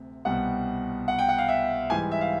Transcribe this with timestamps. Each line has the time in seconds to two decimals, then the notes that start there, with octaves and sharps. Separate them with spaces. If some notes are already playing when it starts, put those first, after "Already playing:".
Already playing: D2 C3
0.25 C2 B2 G3 F#5
1.08 F#5
1.19 G5
1.29 F#5
1.38 F5
1.48 E5
1.90 G#2 E3 G3 G#5
2.11 E5
2.21 F5